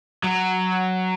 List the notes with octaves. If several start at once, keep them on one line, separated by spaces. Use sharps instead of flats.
F#3